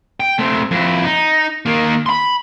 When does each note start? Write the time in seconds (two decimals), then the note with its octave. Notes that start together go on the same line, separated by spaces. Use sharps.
0.20 G5
0.39 A3 C4
0.71 F2 E4
1.05 D#4
1.66 D#3 A#3
2.06 B5 C6